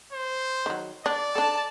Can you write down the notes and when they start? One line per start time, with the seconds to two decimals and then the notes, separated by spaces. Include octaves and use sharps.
0.12 C5
0.66 D#3 F#3
1.06 D4 D5
1.35 D4 A4 A5